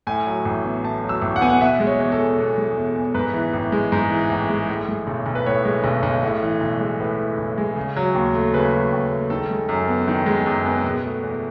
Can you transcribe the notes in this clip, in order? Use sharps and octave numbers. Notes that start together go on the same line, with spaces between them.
A2 G#5
F#3
A1
B3
A2 A5
F#3
E6
A1
F#5
B3 G#5
F#5
B2 E5
G#3
C#5
E2
A4
E2
B2
G#3
E2
E2
G#2 B4
E3
A1
G#3
G#2
E3
A1
G#3
A2
G#3
B1
B1
B4
A2 C#5
G#3
B1
B1
A2
E3
B1
G#3
A2 B4
E3
B1
G#3
C#3
F#3
D#2
A3
C#3 B4
F#3
D#2
A3
D#3 A4
G#3
F#2
B3
D#3
G#3
F#2
B3
B2
A3
E2